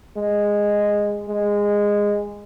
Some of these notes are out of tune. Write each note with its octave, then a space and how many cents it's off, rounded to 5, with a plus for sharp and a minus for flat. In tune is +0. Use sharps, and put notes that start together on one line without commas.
G#3 -10
G#3 -15